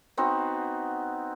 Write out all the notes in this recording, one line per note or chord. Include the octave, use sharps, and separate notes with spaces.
B3 C4 D#4 F#4